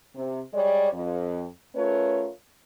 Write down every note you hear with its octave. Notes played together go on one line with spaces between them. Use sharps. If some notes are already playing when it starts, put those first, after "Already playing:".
C3
G3 G#3 C#5 D5
F2
A3 C#4 F4 A#4 B4 C#5